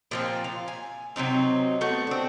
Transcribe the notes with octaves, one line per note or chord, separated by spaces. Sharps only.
A#2 F3 C4
F5
G#5
C3 F#3 C4 D#4
A3 B3 F#4
C4 D4